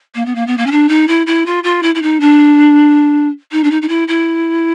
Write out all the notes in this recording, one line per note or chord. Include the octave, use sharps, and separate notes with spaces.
A#3
B3
A#3
B3
A#3
C#4
D4
D#4
E4
E4
F4
F4
E4
E4
D#4
D4
D#4
D4
D#4
D#4
E4
E4